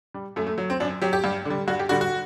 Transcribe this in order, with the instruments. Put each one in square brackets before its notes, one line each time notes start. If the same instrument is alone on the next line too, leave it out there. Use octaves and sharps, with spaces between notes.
[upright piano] G3
F#2 A3
A3
F#3
C4
F#2 D4
F#3 G4
G4
G2
D3
G3
G2 F#4
G4
D3 G3 F#4
F#4